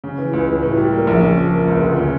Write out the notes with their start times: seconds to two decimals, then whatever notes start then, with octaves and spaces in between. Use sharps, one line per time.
0.04 C#3
0.18 E3
0.33 C#2
0.49 C#2
0.63 A2
0.77 G3
0.93 A#3
1.07 A#1
1.22 C#3
1.37 F3
1.52 A#3
1.67 C#2
1.81 D2
1.97 C#3